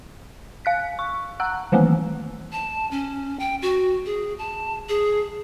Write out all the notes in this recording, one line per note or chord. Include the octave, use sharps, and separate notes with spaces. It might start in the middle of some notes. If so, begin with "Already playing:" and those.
F5 F#6 B6
C#6
F#5 A#5 E6 F#6
D#3 E3 A3 A#3 C4
A5
C#4
G5
F#4
G#4
A5
G#4